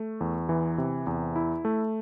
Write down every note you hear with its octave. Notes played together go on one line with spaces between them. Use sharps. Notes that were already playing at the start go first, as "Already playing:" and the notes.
Already playing: A3
E2
E3
C3
E2
E4
A3